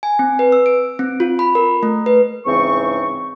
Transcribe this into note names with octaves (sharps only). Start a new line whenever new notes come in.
G#5
C4
B4
E6
D7
C4
F4
B5
A#4
A3
B4
G#2 C#3 E3 C4 C#6